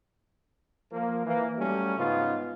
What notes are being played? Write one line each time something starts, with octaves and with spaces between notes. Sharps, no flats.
F3 A#3
E3 A#3
F#3 G3 A3 C#4
G#2 C#3 B3 F4